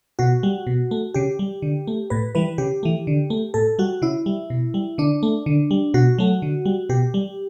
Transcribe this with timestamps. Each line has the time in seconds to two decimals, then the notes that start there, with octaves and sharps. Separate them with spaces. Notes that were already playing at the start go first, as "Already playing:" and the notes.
0.19 B2 F#4
0.43 G3
0.67 B2
0.91 A3
1.14 C#3 G4
1.39 G3
1.62 D3
1.87 A3
2.10 A2 B4
2.35 E3 G3 B4
2.58 C#3 G4
2.83 E3 A3
3.07 D3
3.30 A3
3.54 A2 A4
3.79 G3 F#4
4.02 C#3 E4
4.26 G3
4.50 B2
4.74 G3
4.98 D3 D4
5.23 A3
5.46 D3
5.71 G3
5.94 B2 F#4
6.18 F#3 A3
6.42 D3
6.65 G3
6.89 B2 G4
7.14 G3